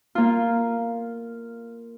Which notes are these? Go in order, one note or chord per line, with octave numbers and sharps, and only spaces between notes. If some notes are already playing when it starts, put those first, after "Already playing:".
A#3 F4